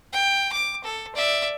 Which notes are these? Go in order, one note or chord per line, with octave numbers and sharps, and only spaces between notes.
G5
D6
A4
D5 E5